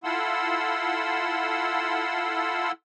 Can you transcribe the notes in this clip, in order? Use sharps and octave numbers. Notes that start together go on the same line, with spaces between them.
E4 F4 A4 F#5 C6 E6